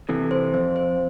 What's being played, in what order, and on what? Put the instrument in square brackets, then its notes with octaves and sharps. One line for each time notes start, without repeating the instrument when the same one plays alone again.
[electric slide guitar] C3 E3 [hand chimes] A4
[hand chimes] C5
[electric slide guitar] F2 [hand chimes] C5
[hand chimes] C5